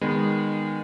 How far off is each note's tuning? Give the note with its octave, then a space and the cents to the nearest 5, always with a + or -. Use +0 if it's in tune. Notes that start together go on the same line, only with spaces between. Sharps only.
D#3 -20 G#3 -30 B3 -10